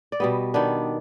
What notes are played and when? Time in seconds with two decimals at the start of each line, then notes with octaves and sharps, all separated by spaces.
0.12 D5
0.20 B2 G3 B3 D#5
0.54 D#3 B3 D4